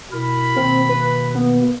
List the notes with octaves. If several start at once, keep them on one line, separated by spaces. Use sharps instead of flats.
B2 E4 A#4 B5
B2 D#3 A#3 C4
B4
B3